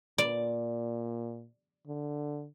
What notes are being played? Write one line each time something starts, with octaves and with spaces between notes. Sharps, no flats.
A#2 D5
D3